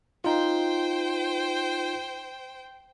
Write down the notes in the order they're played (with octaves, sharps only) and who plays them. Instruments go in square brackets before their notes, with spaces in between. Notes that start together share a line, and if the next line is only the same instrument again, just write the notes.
[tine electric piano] D#4 F4 [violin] C5 G5